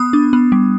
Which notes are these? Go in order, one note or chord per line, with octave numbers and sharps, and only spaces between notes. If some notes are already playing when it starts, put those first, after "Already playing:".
Already playing: B3 D#6
D4
B3
G3